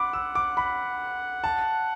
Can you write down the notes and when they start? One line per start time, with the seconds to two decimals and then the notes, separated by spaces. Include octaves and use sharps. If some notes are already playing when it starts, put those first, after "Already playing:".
Already playing: F#5 B5 D6
0.13 E6
0.35 D6
0.57 B5
1.44 A5